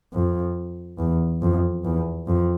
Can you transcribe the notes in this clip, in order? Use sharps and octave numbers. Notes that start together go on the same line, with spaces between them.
F2
E2
F2
E2
F2